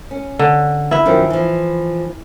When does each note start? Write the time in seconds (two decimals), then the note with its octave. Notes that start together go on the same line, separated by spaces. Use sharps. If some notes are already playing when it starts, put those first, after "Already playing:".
0.11 C#4
0.39 D3
0.91 E4 B4 E5
1.05 F#2 D#3 F3
1.30 E3 F3